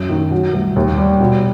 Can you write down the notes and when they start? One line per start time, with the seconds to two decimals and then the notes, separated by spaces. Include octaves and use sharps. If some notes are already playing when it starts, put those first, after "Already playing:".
Already playing: F#2
0.09 D#3
0.31 F#3
0.53 C2
0.76 D#2
0.97 G3
1.20 B2